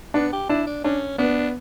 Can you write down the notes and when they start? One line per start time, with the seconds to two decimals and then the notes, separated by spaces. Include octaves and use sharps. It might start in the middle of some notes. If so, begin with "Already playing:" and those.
0.14 B3 D4
0.32 G4
0.49 D4 E4
0.67 D4
0.84 C#4 D4
1.18 B3 D4